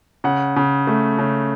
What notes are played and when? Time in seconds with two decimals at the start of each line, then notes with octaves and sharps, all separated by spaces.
0.24 C#3 F#5
0.56 C#3
0.87 A3
1.18 C#3